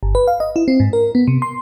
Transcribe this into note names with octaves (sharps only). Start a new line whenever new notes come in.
G1
B4
F5
D#5
E4
C4
G#2
A#4
B3
C3
C6